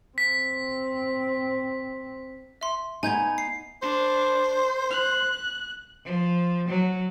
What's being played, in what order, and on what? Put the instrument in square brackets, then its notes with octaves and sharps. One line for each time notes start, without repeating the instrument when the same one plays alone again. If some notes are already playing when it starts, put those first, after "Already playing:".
[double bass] C4 [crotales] B6
[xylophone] E5 C6
[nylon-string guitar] B3 D#4 [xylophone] G#5 G6 G#6
[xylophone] C7
[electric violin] D4 [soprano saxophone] C5
[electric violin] F#6
[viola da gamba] F3
F#3